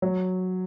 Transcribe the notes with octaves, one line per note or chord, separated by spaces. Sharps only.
F#3